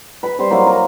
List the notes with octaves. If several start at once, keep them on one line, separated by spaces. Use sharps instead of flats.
B4 B5
G3 C5 C6
F#3 A#3 E4 A#4
A#4